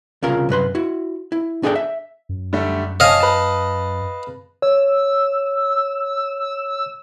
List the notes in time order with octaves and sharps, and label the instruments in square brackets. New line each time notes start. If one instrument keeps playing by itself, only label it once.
[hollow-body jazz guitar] C2 C#3 F4 A#4
C2 F#2 B4 C6
E4 F#4
E4
D4 G#4 A4 D5 G5
E5
[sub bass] F#2
[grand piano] D3 G3 A3
[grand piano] C#5 G#5 A5 [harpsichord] D#5 F5
[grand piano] B4 A5
[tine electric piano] C#5 [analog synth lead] E6